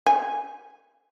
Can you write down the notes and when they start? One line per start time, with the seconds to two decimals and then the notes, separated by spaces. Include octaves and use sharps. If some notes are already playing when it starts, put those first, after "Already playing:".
0.06 G#5